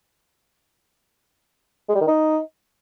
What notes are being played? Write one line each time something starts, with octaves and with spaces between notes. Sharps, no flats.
G#3
G3
D#3
D#4